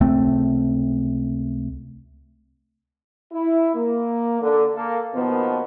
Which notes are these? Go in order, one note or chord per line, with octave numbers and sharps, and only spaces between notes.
C#2 C3 A3 C4
E4
A#3
D3
A#3 A4 F5
D#2 B2 D#3 F3 A#3 B3